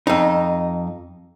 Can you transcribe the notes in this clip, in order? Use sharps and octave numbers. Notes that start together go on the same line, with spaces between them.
F2 D#4